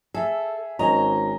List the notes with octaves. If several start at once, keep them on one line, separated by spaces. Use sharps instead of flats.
G#4 A4 E5
G#1 C#4 D#5 G#5 A#5